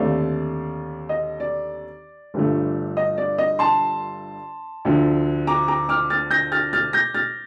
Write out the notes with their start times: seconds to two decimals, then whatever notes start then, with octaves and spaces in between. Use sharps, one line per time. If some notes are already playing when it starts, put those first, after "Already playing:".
Already playing: D#2 D3 A3 C4 D5 F5
1.09 D#5
1.40 D5
2.34 G1 G2 D3 F3 A3
2.97 D#5
3.18 D5
3.38 D#5
3.59 A5 C6
4.85 D2 D3 F3
5.47 A#5 D6
5.68 A#5 D6
5.89 D6 F6
6.10 F6 A6
6.31 G6 A#6
6.52 F6 A6
6.73 F6 A6
6.93 G6 A#6
7.14 F6 A6